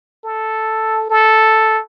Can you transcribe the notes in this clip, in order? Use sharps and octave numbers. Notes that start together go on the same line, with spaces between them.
A4
A4